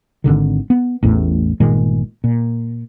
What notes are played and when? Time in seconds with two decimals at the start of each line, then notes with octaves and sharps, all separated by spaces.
0.24 G#1 D#2 D3 D#3
0.70 B3
1.03 A1 E2 A2
1.60 G1 A#2 D#3 G#3
2.24 A#2